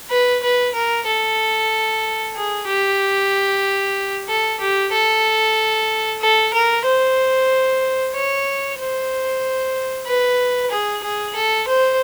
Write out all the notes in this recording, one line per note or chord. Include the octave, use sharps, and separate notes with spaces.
B4
B4
A#4
A4
G#4
G4
A4
G4
A4
A4
A#4
C5
C#5
C5
B4
G#4
G#4
A4
C5